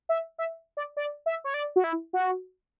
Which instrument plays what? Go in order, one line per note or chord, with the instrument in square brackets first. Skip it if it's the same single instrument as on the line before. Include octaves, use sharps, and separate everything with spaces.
[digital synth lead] E5
E5
D5
D5
E5
C#5
D5
F#4
E4
F#4